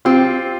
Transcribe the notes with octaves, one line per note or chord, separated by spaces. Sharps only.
C4 F4 G4